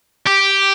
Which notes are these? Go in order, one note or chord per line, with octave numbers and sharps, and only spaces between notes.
G4